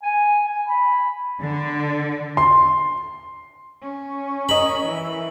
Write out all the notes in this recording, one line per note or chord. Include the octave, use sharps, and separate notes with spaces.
G#5
G#5
B5
D3
C6
C#4
A#4 D#5 B5
E3